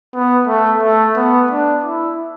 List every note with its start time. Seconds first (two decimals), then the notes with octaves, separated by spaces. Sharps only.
0.14 B3
0.48 A3
0.83 A3
1.16 B3
1.51 D4
1.84 E4